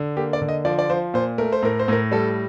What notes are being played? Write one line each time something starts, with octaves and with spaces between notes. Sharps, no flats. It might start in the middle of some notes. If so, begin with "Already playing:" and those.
Already playing: D3
A#3 G4
D5
D3
D#5
F3 D5
D5
F3 C5
A#2 C5
A3 A#4
C5
A2 A#4
C5
A2 A#4
G3 A4